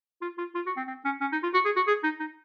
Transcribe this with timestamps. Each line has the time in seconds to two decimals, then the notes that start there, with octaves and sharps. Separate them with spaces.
0.22 F4
0.38 F4
0.55 F4
0.66 F#4
0.77 C4
0.88 C4
1.05 C#4
1.21 C#4
1.32 D#4
1.43 F4
1.54 F#4
1.65 G#4
1.76 F#4
1.87 G#4
2.04 D#4
2.20 D#4